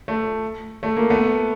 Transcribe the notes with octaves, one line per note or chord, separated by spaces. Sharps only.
A3
A3
A#3
A3 B3